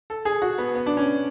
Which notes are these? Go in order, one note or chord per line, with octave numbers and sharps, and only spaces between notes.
A4
G#4
F#4
B3
B3
D4
C#4